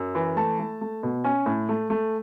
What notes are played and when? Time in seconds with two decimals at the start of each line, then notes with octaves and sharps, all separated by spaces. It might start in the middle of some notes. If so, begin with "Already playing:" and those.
Already playing: F#2
0.15 E3
0.37 A3 A5
0.59 A3
0.81 A3
1.03 B2
1.24 C#4 G#5
1.46 A2
1.69 A3
1.90 A3